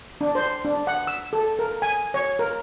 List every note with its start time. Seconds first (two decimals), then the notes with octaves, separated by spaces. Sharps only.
0.21 D4
0.35 C5
0.65 D4
0.87 F#5
1.07 E6
1.33 A4
1.59 A#4
1.82 G#5
2.14 C#5
2.39 A#4